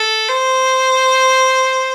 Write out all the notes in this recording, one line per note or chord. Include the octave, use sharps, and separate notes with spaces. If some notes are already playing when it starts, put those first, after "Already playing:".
Already playing: A4
C5